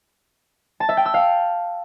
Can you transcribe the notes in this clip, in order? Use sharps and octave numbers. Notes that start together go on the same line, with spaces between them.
A5
E5
G5
E6
F5